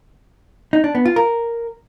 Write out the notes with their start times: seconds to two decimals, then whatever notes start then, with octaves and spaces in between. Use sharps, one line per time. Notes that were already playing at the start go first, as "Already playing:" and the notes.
0.73 D#4
0.84 D4
0.95 B3
1.05 F4
1.16 A#4